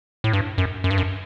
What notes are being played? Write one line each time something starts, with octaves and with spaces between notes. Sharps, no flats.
A2
G2
F#2
F#2
G2
F#2